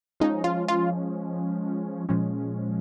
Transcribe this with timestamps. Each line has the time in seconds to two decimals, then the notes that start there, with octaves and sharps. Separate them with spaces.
0.20 F3 G#3 C#4 D#4
0.44 F4
0.68 F4
2.09 A#2 F3 G#3 C#4